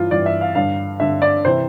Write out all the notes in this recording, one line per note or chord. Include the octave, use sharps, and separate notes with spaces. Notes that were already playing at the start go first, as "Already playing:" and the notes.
Already playing: G2 E3 F4
G2 E3 D5
E5
F5
G2 D3 F5
G2 D3 E5
D5
C3 E3 C5